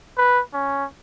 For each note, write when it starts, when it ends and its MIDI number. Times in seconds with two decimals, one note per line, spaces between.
0.17 0.41 71
0.54 0.85 61